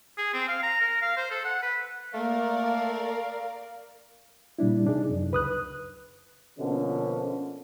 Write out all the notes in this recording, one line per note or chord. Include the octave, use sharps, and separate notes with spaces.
G#4
C4
F5
A#5
A#4
F5
C5
A4
F#5
B4
A3 A#3 A#4 D5 F5
A#2 G3 D4 E4
C3 D4 D#4 G#4
F#2
C#2 B4 D#6 F#6
B2 D3 F3 A#3 C#4